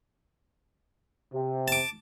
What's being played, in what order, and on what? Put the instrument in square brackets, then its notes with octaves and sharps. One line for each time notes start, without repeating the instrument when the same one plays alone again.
[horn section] C3
[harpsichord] A5 D6